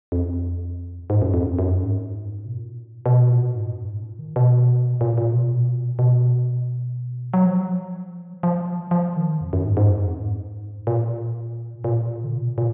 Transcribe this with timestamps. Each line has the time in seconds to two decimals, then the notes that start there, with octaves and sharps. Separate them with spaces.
0.12 F2
1.10 G#2
1.22 F#2
1.34 F2
1.46 F#2
1.59 F#2
1.83 G#2
2.45 B2
2.56 A#2
3.06 B2
3.30 A#2
3.54 G#2
3.71 F#2
3.87 G#2
4.03 A#2
4.19 D#3
4.36 B2
5.01 A#2
5.18 A#2
5.33 B2
5.99 B2
7.34 F#3
7.46 F3
8.43 F3
8.91 F3
9.16 D#3
9.41 F2
9.53 F#2
9.65 G#2
9.77 G#2
9.89 F#2
10.06 F2
10.22 G#2
10.87 A#2
11.84 A#2
12.24 D3
12.34 B2
12.58 A#2